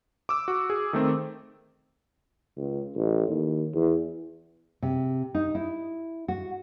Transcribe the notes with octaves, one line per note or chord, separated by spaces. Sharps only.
D6 E6
F#4
G#4
D#3 A3 C4
C#2
A1
D#2
E2
C3
D#4
E4
F#4